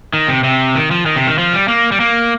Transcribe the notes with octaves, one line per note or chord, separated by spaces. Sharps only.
D#3
C3
C3
D#3
F3
D#3
C3
D#3
F3
G3
A#3
G3
A#3